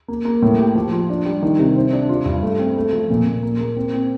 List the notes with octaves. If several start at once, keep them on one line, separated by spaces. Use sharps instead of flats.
A#3
A#3
A2
G4
F3
F4
D4
G3
D#3
C3
C5
D4
F4
G2
A3
C4
A3
F3
A#2
A#2
A#3
A#3
C4
C4